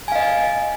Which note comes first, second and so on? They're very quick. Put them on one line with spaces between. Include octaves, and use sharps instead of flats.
G#5 F5 D#5